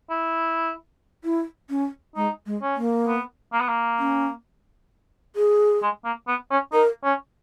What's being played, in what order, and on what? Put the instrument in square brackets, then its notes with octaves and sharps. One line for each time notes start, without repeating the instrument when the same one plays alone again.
[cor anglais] E4
[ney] E4
C#4
[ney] G#3 [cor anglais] D#4
[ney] G#3
[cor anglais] C#4
[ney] A#3
[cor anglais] B3
A#3
B3
A#3
[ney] C#4
G#4
[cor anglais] G#3
A#3
B3
C#4
[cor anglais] D#4 [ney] A#4
[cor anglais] C#4